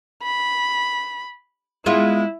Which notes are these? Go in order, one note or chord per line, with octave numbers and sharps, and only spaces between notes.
B5
G#3 B3 E4 F4